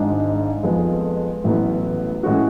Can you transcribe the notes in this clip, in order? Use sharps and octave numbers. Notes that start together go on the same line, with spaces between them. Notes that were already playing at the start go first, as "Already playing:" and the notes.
Already playing: G#1 G#2 G#3 D4
F2 F3 G#3 B3
A1 A2 F#3 B3
A2 G#3 C#4 F#4